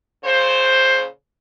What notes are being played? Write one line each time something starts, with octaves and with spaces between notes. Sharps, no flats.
A#2 C#3 C5